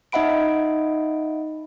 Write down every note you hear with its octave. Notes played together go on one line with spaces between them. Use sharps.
D#4 D#5 E5 F#5 B5 D7